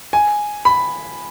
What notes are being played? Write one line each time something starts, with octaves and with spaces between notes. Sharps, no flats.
G#5
B5